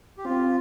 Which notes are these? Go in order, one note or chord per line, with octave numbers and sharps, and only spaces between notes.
G4
C4 F4